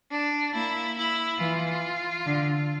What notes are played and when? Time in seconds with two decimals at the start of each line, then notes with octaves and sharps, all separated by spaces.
0.11 D4
0.54 A#3 E4
0.98 E4
1.40 E3 F4
2.27 D3